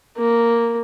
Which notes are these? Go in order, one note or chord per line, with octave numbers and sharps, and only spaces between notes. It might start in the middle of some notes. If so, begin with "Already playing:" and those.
A#3